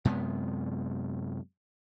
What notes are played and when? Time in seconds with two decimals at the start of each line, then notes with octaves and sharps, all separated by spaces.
0.05 F#2 C3 G#3 B3